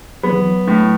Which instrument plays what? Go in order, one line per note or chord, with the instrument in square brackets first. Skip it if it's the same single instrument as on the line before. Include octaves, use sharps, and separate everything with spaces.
[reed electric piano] F#3 [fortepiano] B3
[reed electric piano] E3
F#3
[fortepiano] A2